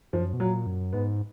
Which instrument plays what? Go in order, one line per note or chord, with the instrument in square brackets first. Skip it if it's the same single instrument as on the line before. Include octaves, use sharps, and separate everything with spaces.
[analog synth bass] F#2 [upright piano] F3
[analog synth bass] B2
[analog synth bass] A#2 [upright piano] F#3
[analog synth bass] F#2
[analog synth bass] G#2 [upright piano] B3